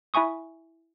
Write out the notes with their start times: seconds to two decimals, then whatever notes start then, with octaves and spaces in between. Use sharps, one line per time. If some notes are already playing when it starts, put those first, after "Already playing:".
0.14 E4 E5 G#5 C#6 D#6